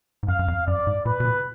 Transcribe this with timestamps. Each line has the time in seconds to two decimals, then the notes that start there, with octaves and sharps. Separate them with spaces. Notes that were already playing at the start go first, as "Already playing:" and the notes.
0.23 G#2
0.28 F#2 F5
0.39 F#2
0.48 F2
0.67 F#2 D5
0.87 G#2
1.06 A#2 B4
1.20 B2
1.25 A#2